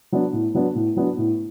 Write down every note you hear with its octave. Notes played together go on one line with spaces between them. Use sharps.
F#3 B3 D4
A2
F#3 B3 D4
A2
F#3 B3 D4
A2